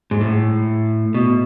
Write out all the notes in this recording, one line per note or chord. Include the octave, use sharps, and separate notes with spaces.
G#2
A2
B2